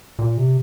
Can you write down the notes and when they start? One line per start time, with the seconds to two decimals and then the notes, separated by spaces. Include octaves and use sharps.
0.19 A#2
0.38 C3